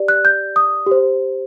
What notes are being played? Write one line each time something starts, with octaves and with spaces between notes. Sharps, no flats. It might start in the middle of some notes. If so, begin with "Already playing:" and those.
Already playing: G4 D5
F#6
G6
D#6
G4 C5